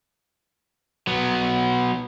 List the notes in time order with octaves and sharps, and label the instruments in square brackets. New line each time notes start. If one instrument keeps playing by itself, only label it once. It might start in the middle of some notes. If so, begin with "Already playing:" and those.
[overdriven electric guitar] F#3 B3